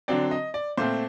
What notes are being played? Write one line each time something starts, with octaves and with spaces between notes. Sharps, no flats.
D3 F#3 C4 D5
D#5
D5
A#2 A3 C4 C5